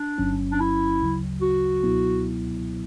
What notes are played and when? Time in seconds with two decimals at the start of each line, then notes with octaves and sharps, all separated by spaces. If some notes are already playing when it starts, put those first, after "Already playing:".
Already playing: D4
0.18 G1 G2 F#3 C#4
0.52 D4
0.60 E4
1.01 D2 C#3 F#3
1.42 F#4
1.83 C#2 B2 F#3 B3 E4